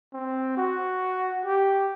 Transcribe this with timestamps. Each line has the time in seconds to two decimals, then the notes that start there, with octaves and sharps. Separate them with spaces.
0.13 C4
0.57 F#4
1.46 G4